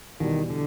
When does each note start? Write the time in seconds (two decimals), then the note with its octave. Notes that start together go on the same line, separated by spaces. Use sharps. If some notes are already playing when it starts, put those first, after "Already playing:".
0.20 E2 B2 D#3 G3
0.50 D3